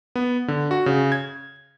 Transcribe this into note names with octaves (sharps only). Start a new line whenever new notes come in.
B3
D3
F#4
C#3
G#6